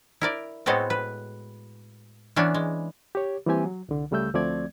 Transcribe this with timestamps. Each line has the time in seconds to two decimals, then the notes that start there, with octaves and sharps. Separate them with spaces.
0.21 E4 A#4 D5
0.66 A2 G#3 B3 C4 F#4 A4
0.90 B4
2.36 E3 B3 C#4 D4
2.54 G#3
3.15 G4 C#5
3.46 E3 G3 A#3 C4 G4 G#5
3.65 F#3
3.89 C2 D3
4.11 C#2 C#3 G3 A3 E6 G6
4.34 D2 F3 A3 C4 D5 G#6